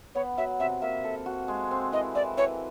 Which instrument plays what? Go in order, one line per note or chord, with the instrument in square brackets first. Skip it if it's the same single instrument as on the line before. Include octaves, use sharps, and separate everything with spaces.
[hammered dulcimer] B3 [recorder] C#5
[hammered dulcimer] F#3 [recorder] E5
[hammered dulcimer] C3 [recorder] E5
[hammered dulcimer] A#3 [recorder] E5
[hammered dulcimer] A4
F#4
G#3
C4
[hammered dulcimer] E3 [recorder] D#5
[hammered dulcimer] E3 [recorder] D5
[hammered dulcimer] E3 [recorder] C#5